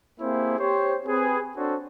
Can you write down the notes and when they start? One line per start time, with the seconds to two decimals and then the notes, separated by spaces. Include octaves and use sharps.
0.20 A#3 C4 E4 G4 G#4 C5
0.59 G4 C5 C#5
1.06 C4 G#4 B4
1.57 C4 D4 F#4 A4 C5 C#5